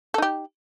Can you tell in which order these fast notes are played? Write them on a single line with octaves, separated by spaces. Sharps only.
A4 D#4 G4